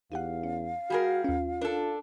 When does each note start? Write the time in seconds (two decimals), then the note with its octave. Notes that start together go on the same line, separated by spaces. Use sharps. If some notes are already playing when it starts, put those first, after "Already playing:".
0.12 E2 D#4 G4 F5 F#5
0.43 C#4
0.90 G3 F#4 G#4 A#4
1.24 D#2 C#4 F4
1.61 D4 A4 A#4